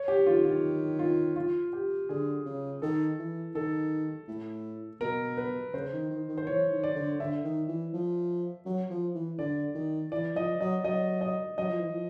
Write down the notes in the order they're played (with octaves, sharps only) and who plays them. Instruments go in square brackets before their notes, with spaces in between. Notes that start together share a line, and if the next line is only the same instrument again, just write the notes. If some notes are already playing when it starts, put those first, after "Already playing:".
Already playing: [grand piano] C#5
G4
[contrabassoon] D#3 [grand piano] F4
[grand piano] F4
F4
F4
G4
[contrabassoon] D3 [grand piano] G#4
[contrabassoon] C#3
[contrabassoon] D#3 [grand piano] A4
[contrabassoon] E3
[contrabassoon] D#3 [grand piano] A4
[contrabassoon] A2
[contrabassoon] B2 [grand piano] A#4
[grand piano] B4
[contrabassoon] C#3 [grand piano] C5
[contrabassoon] D#3
D#3
D#3
[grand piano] C5
[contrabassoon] E3 [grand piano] C#5
[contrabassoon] D#3
[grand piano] D5
[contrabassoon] D3
[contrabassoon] D3 [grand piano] E5
[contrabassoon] D#3
E3
F3
F#3
F3
E3
[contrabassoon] D3 [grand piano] D5
[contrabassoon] D#3
[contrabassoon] E3 [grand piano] D5
[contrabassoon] F3 [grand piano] D#5
[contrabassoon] F#3 [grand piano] D#5
[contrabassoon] F#3 [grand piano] D#5
[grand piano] D#5
[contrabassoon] F#3 [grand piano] D#5
[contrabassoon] F3
E3
F3